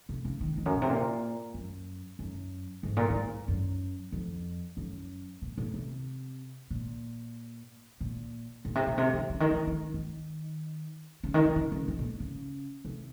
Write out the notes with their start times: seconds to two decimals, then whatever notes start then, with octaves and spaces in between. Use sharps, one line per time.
0.09 C3
0.25 C#3
0.41 D#3
0.58 F2
0.66 F#2
0.73 A#2
0.82 C3
0.89 A#2
1.54 F#2
2.19 F#2
2.83 G#2
2.97 A#2
3.10 G#2
3.48 F#2
4.12 F2
4.77 F#2
5.42 A#2
5.58 A#2
5.74 C3
6.71 A#2
8.01 A#2
8.65 A#2
8.75 C3
8.87 A#2
8.98 C3
9.13 D#3
9.30 C#3
9.40 D#3
9.51 D#3
9.67 D#3
9.94 D#3
11.24 C#3
11.34 D#3
11.45 D#3
11.56 C#3
11.72 C#3
11.88 G#2
11.99 A#2
12.20 C#3
12.85 C3